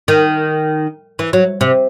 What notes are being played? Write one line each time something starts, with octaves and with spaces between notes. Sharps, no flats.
D#3
E3
F#3
C3